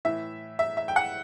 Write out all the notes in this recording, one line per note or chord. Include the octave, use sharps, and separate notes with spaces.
A2 E3 E5
E5
E5
G5
F#5